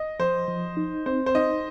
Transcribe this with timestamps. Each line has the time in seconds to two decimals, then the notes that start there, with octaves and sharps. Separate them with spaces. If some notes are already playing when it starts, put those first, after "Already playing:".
Already playing: D#5
0.20 F3 C5
0.48 F3
0.77 D#4
1.06 C4 C5
1.26 C5
1.35 D#4 D#5